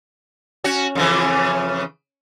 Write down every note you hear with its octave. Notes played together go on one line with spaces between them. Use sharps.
C#4 F#4
F2 C#3 E3